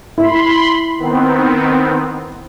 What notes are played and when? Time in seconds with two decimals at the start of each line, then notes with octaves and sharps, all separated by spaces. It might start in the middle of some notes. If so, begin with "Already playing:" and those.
0.18 E4 B5 C6
0.98 D#3 B3 C4